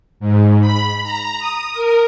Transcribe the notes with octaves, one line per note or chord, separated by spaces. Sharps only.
G#2
B5
A#5
D#6
A#4